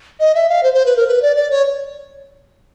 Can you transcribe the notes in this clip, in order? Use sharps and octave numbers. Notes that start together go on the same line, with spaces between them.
D#5
E5
F5
C5
C5
B4
A#4
B4
D5
D5
C#5